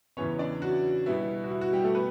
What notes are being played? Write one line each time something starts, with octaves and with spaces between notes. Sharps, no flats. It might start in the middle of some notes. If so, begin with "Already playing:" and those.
E2 C#3 E3 B3 C#4 C#5
D4 D5
F#4
B2 G3 B3 E4
F#4
E4
F#4
G3 G4
A3 A4
B3 B4